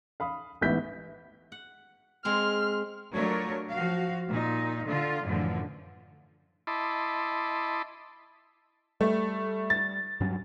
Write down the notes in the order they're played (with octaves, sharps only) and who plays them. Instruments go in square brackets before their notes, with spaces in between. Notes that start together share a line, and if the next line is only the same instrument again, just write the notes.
[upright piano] F5 B5 D#6
A1 G#2 B3 E5 G6 B6
[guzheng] F#5
[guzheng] G#3 C4 C5 [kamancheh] F6
[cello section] F#3 A3 D4 F4 A#4 C#5
F3 F#4 F5
A#2 D#4
D3 F4
F#2 A2 D3 E3 F3
[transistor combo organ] E4 D#5 A5 B5 C6 D6
[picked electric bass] G3 [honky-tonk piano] A3
[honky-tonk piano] A6
[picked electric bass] G2 F#3 C#4